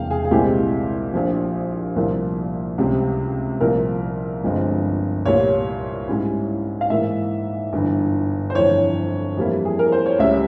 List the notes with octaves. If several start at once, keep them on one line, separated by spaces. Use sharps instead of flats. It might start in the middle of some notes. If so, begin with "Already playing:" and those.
Already playing: E1 E2 C3 A#3 F5 G5
G#4
G#4
C2 A#2 G#3 C4 E4 G4
A#1 A#2 F3
C2 A#2 F3 A#3
C#2 C3 G3 C4
C2 A#2 F3 A#4
G1 G2 F3 G#3 C4
C2 A#2 G3 C#5
G#2 G3 C#4 E4
F5
G#2 E3 A#3 E5
G1 G2 E3
C5
G1 F2 E3 C#5
F2 E3 G3 A#3 E4
G#4
A#4
C5
C#5
C#2 C#3 G3 E5